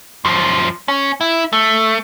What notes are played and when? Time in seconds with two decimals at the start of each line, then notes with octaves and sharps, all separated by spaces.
0.25 F#2 F3
0.88 C#4
1.21 E4
1.53 A3